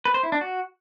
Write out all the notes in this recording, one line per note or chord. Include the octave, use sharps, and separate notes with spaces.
B4
C5
E4
D4
F#4